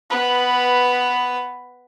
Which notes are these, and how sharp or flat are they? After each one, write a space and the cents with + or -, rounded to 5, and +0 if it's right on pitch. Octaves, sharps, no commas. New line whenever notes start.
B3 +5 B4 +0